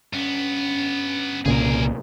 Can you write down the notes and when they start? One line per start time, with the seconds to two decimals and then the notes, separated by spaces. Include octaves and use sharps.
0.13 G2 B3 C#4
1.46 C2 A#2 C#3 G#4 A#4